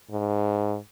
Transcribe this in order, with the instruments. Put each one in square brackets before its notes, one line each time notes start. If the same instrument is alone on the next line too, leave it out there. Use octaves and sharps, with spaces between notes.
[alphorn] G#2